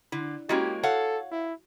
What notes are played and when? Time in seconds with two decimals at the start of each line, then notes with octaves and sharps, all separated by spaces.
0.12 D3 E4
0.49 G#3 A#3 C#4 E4 F#4 G4 D#5
0.83 A4 C#5 F5 F#5
1.31 E4